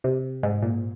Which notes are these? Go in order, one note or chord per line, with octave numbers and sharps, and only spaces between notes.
C3
G#2
A#2